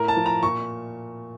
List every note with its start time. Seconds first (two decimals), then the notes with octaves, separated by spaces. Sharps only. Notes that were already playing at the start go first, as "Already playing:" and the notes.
Already playing: A2 A#4
0.08 A5
0.17 F3
0.26 A#5
0.43 A#2 C#6